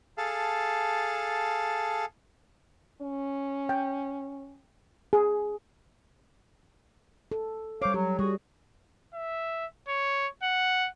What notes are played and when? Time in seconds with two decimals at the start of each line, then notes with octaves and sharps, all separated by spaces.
0.18 G#4 A4 F5 A5
3.01 C#4
3.69 G5
5.13 G#4
7.32 A4
7.82 G3 C5 C#5 F5 D6
7.94 F#3 G4
8.19 G3 F#4 G#4
9.14 E5
9.88 C#5
10.43 F#5